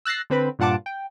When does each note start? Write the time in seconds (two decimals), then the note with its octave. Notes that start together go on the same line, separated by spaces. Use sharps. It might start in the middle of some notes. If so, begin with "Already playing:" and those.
0.05 E6 F#6 A6 A#6 C7
0.30 D3 C4 B4 B5
0.59 G2 A#2 F4 F#5 A5 D6
0.86 G5